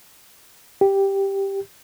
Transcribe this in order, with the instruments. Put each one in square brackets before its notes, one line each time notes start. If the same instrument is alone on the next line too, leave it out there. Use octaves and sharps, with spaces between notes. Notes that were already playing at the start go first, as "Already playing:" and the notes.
[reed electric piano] G4